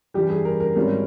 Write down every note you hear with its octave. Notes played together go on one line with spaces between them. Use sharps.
G2 E3 G3 G4
G#4
A#4
A#4
G#1 G#2 G3 C#4 E4